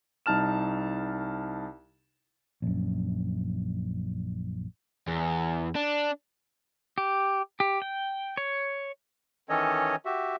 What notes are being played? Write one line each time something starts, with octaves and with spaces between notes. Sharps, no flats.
C2 D#4 A5 F6 E7
A#1 F#2
E2
D4
G4
G4
G5
C#5
D#3 E3 C#4 A4 C#5 D#5
F#4 G4 E5